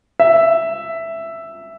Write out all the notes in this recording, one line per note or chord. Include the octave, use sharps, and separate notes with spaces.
E5